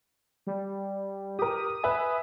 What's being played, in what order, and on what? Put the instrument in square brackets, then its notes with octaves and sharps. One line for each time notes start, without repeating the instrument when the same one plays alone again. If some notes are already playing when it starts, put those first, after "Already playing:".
[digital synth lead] G3
[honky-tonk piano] G4 A#4 [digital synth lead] D#6
[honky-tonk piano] B4 E5 G#5